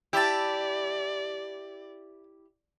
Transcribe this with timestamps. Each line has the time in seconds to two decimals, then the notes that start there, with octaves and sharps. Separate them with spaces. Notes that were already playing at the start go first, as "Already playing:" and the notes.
0.13 E4 G4 D5 E5 A5